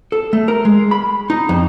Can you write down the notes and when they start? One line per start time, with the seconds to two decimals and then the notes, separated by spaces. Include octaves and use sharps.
0.12 A4
0.33 A3
0.48 A#4
0.65 G#3
0.91 B5
1.30 D#4
1.49 F2